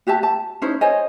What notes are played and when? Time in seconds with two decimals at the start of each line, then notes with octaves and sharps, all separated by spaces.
0.07 F#4 G4 E5 A5
0.23 A5
0.62 C#4 D#4 E4 C5
0.81 C5 C#5 D#5 G#5